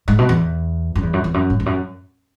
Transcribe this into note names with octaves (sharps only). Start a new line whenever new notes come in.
G#2
B2
E2
F#2
E2
F#2
E2
F#2
G#2
E2
F#2